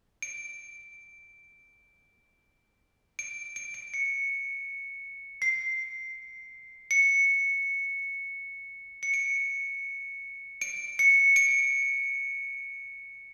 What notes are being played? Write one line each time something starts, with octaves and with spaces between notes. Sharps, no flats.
D7
D7
D7
D7
C#7
C7
C#7
C#7
D7
D7
C#7
D7